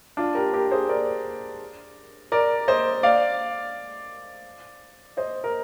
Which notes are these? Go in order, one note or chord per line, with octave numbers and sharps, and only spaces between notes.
D4 F4
G4 A#4
G4 A#4
G#4 C5
A#4 D5
A#4 D5
C5 D#5
D5 F5
C5 D#5
A#4